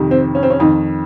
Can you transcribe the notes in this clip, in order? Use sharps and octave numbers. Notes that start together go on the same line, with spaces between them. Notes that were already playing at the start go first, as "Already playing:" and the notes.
Already playing: F2 C3 D#3
C4
C#4
C4
C#4
F2 D#3 D#4